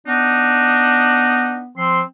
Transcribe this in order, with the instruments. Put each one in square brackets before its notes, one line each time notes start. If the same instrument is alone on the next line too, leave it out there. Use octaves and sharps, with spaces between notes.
[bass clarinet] B3 [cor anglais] D4 [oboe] D#4
[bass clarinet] F3 [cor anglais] C4 [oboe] C6